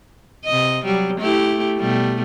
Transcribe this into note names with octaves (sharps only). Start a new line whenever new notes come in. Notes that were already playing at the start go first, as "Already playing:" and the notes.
C3 D#5
F#3 G3
A3 E4 G4
B2 G3 A3